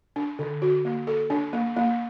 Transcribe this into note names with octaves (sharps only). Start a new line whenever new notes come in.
D4
D3
F#4
A#3
A4
D4
A#3
A#3